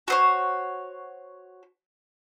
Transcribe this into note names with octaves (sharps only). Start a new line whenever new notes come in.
F#4 C5 C#5